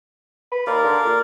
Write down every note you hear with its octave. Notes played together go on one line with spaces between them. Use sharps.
B4
D#2 A#4 D5 F5
D3
A#2